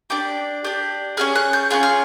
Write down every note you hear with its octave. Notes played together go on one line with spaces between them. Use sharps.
D4 G4 D6
D4 G4
C#4 F4 G#4 F6
F#6
G6
C#4 F4 G#4 F#6
F6